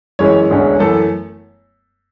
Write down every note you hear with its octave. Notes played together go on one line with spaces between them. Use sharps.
F#2 E3 G#3 C#4 C#5
E1 D2 D3 G#3 C#4
F#2 E3 A3 A4